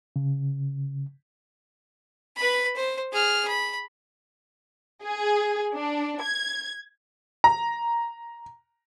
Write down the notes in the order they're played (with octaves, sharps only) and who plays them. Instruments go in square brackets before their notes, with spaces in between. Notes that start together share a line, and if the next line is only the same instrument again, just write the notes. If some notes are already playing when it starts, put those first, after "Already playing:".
[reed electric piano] C#3
[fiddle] B4 B5
C5
G#4 F6
B5
[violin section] G#4
D4
G#6
[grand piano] A#5